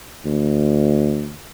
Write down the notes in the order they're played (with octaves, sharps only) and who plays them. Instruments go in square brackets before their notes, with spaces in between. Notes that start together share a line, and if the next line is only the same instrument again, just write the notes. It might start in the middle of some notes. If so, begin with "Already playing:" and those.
[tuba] D2